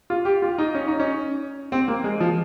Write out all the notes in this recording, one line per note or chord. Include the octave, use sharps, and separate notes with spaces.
F4
G4
F4
D#4
C#4
D#4
C#4
C4
A#3
G#3
F3